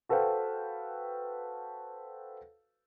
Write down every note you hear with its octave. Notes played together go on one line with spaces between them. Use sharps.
F#4 A4 B4 C5 F5 G5